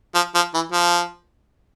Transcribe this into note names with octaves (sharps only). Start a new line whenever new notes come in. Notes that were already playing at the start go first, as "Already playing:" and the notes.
F3
F3
E3
F3